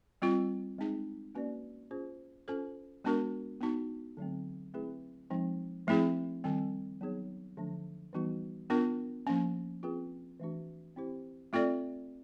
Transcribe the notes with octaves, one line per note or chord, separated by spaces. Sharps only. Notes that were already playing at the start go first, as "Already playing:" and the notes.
G3 C4 F4
G#3 C4 D#4 G#4
A#3 C#4 F#4 B4 D5
C#4 F4 G#4 C5
C#4 F4 A4 C5
G#3 B3 D4 F#4 A#4
B3 D#4 F#4
D3 F#3 A3 C4
A3 C4 E4 G#4 B4
F3 G#3 C4 D#4
F3 A3 C4 E4 G#4
D#3 G3 C4
F#3 B3 D#4 G#4 C#5
D3 F3 A3 D4
E3 G3 B3 D#4 F#4
B3 D4 F4 A#4
F3 A#3 C#4
C4 F4 G#4 B4
E3 A3 D4 F#4
C4 E4 G4 C5
A3 C4 F4 A4 D5